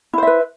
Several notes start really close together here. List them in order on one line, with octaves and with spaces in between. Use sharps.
E4 C5 E5 B4